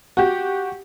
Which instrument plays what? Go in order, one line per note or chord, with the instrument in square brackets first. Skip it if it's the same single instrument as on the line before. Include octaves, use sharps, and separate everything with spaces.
[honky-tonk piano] F#4 G4